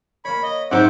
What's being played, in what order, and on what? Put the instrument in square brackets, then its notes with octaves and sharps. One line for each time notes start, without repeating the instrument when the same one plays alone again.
[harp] A#3 C#5 [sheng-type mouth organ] B5
[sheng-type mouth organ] D#5
[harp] G#2 F#3 G6 [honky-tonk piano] C4 D#4 [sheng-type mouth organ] E5 F#5 D6